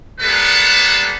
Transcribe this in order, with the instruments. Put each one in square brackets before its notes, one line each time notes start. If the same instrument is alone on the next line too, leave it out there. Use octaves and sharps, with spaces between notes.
[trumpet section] G3 G#3 A#3 B3 A4 B4